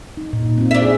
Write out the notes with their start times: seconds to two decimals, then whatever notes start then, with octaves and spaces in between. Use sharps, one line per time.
0.17 D#4
0.33 A#2
0.58 C4 F4
0.71 D4 E5
0.82 G#4